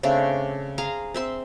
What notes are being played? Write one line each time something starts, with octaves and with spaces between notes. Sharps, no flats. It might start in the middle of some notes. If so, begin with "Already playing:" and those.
C#3 A3 C4 D4
G#4 F5 A#5 C6
C4 E5 C6